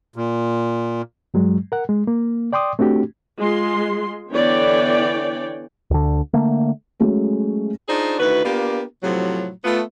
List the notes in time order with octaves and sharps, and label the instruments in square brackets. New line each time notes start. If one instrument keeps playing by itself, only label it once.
[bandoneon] A#2
[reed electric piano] G2 F#3 G#3
A#4 F#5
G#3
A#3
D5 G5 C6 D6 D#6
A3 C4 D4 F#4 G4
[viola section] G#3 F4 C6
D3 E3 B3 C#5 D5 G5
[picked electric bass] D2 D3
D3 A3 A#3
[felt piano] F#3 G#3 A3 C#4
[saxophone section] D4 D#4 F4 G#4 C5 D5
D2 D#3 E4 F#4 B4
A#3 B3 D4 F4 G4 A#4
A2 C3 F3 F#3
A3 B3 F4